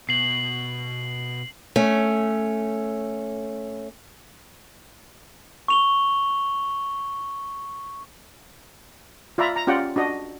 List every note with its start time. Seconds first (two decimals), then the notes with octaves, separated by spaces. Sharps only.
0.09 B2 C7 F#7
1.76 A3 C#4
5.68 C#6 F7 G7
9.38 F4 D5 E5 A#5 B5
9.56 A#5
9.67 C#4 F4 G4 D5 F#5 G5
9.96 D4 F#4 D#5